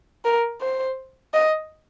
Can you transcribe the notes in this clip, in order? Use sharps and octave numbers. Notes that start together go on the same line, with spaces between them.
A#4
C5
D#5